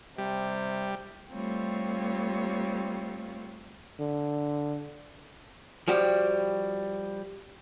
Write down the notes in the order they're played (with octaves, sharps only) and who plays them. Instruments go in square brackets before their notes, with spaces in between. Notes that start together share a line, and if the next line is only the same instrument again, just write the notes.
[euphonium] C3 [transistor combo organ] G3
[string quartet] G3 A3 C4 F4 C#5
[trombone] D3
[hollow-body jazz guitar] F3 G3 F#4 G4